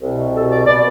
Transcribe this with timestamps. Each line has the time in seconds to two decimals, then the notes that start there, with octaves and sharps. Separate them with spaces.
0.02 C2 B2
0.35 A4
0.51 D5
0.67 B2 D5